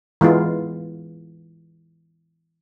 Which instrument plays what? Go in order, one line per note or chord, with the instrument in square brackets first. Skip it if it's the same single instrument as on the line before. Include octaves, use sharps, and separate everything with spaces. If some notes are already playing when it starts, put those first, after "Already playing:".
[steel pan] E3 G#3 B3 F4